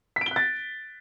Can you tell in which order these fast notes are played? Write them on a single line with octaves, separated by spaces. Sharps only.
B6 D7 G7 F#6 A6